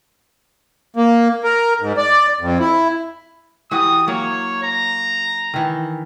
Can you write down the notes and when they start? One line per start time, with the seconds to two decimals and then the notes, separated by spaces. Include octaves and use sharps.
0.96 A#3
1.44 A#4
1.81 G#2
1.97 D5
2.40 F2
2.60 E4
3.71 E3 F#4 G4 D#6
4.08 F#3 A#3 C#5
4.63 A#5
5.54 D#3 E3